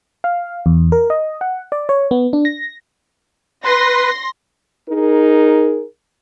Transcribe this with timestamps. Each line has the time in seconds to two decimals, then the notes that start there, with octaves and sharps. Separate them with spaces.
0.24 F5
0.66 E2
0.92 A#4
1.10 D#5
1.41 F#5
1.72 D5
1.89 C#5
2.11 B3
2.33 D4
2.45 A#6
3.65 B4 C6 A#6
4.89 D#4 G#4 A#4